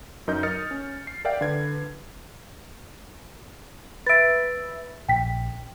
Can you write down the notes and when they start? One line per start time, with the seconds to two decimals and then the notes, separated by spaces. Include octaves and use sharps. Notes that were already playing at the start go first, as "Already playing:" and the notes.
0.28 F#2 D#4 A#4 D#5 G6
0.43 A#4 D#5 D#6 F6 A6 C#7
0.71 C#4
1.07 C7
1.25 A#4 D5 E5 F5 G5
1.41 D3 B4 G#6
4.07 B4 E5 A6 D7
5.09 A#1 G5 B6